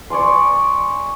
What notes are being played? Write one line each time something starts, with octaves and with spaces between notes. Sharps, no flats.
C#5 D5 G#5 C6